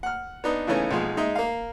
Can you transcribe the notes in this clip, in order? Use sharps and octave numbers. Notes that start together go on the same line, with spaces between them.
F#5 F6
B3 D4 D#4
C#3 E3 A3 B3 C#4 D#4
B1 F3 G#3
G#3 D#4 E5
A#3 F5